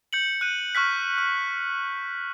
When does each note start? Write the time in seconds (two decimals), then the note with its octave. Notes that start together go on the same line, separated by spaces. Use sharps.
0.13 G6 C#7 F#7
0.41 F#6 D#7
0.75 C#6 F6 F#6 B6
1.18 F6